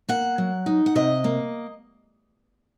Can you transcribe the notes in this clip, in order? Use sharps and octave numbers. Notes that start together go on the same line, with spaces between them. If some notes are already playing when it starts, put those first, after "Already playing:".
A#3 F#5
F#3
D#4
F#5
C3 D#5
A#3